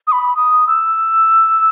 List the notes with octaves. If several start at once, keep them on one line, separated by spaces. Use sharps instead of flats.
D#6
B5
D#6
E6